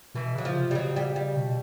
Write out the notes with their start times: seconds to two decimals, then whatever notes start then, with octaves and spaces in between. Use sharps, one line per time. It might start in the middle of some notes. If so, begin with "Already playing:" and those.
0.15 B2 E3
0.35 C#3 F#3
0.45 F3
0.55 C3
0.71 G3
0.75 C#3 F#3
0.96 G3
1.16 G3
1.36 B2